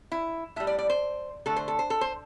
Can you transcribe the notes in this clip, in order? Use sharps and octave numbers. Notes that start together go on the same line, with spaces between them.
E4
A2 G3 E5
D5
D5
C5
D3 A3 A4
C5
A4
C5
A4
C5